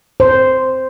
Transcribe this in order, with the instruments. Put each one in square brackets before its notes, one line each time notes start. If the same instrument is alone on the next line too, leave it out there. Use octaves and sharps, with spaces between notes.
[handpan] C5